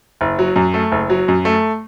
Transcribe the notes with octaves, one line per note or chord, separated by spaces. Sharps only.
F#1
F#3
F#2
A3
F#1
F#3
F#2
A3